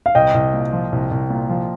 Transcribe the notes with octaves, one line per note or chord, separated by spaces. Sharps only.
F5
C2 D#5 G5
C2
A#2
F3
C2
C2
A#2
F3